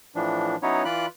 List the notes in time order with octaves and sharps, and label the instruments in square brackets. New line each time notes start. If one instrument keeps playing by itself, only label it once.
[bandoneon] A2 E3 F3 D4
F#3 B3 C#4 D#4 E4 C#5
E3 F4 D5 B5 F#6